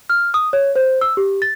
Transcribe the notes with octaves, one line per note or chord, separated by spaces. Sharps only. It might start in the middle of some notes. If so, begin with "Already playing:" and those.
F6
D#6
C#5
C5
E6
G4
A6